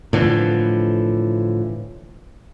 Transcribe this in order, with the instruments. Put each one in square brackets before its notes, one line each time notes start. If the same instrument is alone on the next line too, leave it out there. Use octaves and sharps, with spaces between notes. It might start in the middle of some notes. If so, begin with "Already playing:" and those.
[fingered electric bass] A2 D3 E3 F3